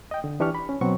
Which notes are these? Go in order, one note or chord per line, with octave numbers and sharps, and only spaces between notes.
D#5 G5
D3
E3 D4 G4 C#6 F6
B5
C#4
B2 F#3 C4 F#4 C#6